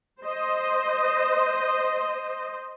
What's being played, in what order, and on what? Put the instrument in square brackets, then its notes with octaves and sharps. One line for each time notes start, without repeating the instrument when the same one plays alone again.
[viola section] C5 D#5